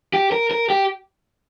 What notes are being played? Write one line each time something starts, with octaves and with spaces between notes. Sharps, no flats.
G4
A#4
A#4
G4